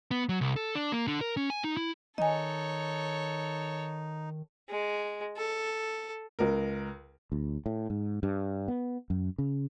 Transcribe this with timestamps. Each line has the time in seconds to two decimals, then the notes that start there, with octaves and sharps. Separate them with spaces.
0.11 B3
0.29 F#3
0.41 C2
0.56 A4
0.75 D4
0.92 A#3
1.08 D3
1.21 A#4
1.37 C#4
1.50 G#5
1.64 D#4
1.77 E4
2.18 D#3 D#4 A4 C#5 D#5 G#5
4.69 G#3
5.37 A4
6.39 C#2 A#4
7.32 D2
7.66 A2
7.90 G#2
8.23 G2
8.68 B3
9.10 F#2
9.38 C#3